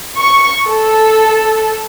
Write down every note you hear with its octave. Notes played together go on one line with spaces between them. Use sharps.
C#6
A4